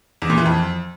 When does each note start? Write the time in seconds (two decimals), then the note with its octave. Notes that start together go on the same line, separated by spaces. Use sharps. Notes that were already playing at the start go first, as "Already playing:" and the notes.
0.22 E2
0.30 A#2
0.38 E3
0.46 F2